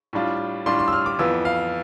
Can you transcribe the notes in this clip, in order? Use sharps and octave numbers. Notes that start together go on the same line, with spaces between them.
A2 G3 D4 F4
A2 G3 D4 F4 C6
C6
E6
F6
D6
F2 E3 B3 F4 E6
F5